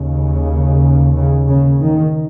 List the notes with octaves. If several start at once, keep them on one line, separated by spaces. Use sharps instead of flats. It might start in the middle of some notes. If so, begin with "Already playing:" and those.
Already playing: D#2 C#3
C#3
C#3
D#3